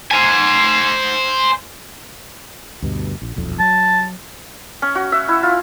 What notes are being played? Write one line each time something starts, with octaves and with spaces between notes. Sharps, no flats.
C5 G#5
D2 G2 B2
A#1
D#1 B1 F2
F#3 A5
C#4
F#4
E5
E4
F4